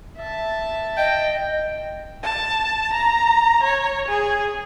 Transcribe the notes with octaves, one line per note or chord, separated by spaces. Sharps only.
E5 A5
D#5 G5
A5
A#5
C#5
G#4